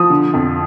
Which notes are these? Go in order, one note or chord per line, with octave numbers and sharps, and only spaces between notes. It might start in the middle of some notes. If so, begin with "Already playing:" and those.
Already playing: F3 D#6
D3
F2